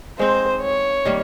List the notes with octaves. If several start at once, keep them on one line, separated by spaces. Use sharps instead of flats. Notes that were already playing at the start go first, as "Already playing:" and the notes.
G#3 C4 D#4 C5
C#5
D#3 G3 A#3